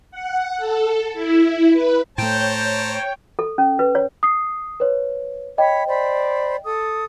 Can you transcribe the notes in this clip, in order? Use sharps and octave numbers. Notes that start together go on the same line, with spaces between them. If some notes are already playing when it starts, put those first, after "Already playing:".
F#5
A4
E4
B4
A2 A3 C5 C#5 G5 A5 A#5
A4
C#4
B4
C#5
D#6 C7
B4 C#5
C#5 D#5 G5 B5
C5 D5 B5
A4 D#6